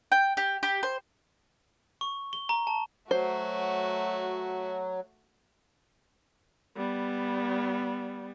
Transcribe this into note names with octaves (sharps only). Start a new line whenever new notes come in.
G5
G4
G4
C5
C#6
G7
A#5
A5
F#3 A3 F#4 C5
G3 B3